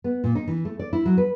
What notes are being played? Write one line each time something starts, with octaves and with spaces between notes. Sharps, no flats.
B3
A#2
D#4
E3
A3
D5
E4
F#3
B4